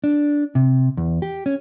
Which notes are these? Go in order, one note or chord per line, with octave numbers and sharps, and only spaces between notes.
D4
C3
E2
G4
C#4